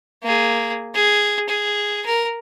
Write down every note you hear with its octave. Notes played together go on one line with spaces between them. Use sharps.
A#3 G#4
G#4
G#4
A#4